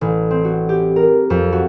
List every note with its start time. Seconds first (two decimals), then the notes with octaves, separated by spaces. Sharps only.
0.01 A1
0.31 C4
0.45 F#4
0.69 G4
0.96 A#4
1.30 F2
1.52 F#4